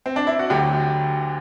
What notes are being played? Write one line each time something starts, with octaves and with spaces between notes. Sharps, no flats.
C4
D4
E4
F#4
D2 D3 F#3 G4